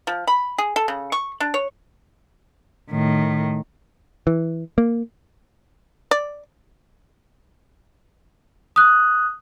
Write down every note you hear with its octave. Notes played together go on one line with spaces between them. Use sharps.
F3
B5
G#4
A4
C#3
C#6
D4
C#5
A2 D#3
E3
A#3
D5
D#6 F#6